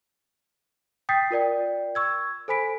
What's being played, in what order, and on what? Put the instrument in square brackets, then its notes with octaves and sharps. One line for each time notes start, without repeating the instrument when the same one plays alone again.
[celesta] G5 D#6 G6 A6 B6 C7
F4 A#4 D5 G5
C#6 E6 G#6
A4 C5 G#5 B5 B6 D7